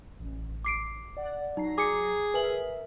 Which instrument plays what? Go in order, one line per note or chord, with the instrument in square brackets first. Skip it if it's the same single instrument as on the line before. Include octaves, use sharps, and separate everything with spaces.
[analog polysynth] A1
[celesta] D6 C7 D7
[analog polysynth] D5 F#5
[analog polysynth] F#3 A#5 C7 [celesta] D#4
[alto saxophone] G#4 [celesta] D6 C#7
[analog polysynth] A#4 E5 [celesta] B4 G#5 F#7